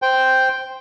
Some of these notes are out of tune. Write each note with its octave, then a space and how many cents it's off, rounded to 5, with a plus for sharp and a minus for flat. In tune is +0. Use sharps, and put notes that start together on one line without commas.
C5 +0 G5 +0